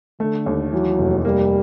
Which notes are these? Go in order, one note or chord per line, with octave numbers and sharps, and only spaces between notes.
D3 A3
D#2
E3 F#3
F1
G3 A#3